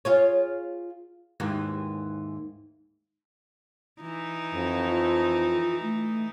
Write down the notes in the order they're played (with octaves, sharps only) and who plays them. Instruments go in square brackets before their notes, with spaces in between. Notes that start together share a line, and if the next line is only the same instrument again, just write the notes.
[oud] F4 G#4 C#5
D#2 G#2 E3
[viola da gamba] E3 D#4
[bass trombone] F2
[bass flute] F4
A3